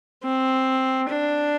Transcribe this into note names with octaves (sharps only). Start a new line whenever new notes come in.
C4
D4